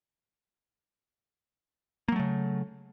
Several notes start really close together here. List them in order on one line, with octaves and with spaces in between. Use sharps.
A#3 F#3 A3 C#3